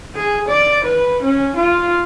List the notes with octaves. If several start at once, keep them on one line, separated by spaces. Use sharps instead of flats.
G#4
D5
B4
C#4
F4